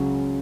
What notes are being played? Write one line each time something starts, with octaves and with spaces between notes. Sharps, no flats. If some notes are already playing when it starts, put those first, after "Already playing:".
Already playing: C#2 C#3 F#3 C#4 F#4